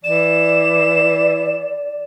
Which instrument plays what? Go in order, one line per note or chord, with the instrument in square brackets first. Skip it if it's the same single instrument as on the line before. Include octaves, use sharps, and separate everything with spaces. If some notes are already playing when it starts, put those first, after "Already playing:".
[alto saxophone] E3 [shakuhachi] D5 [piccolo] E7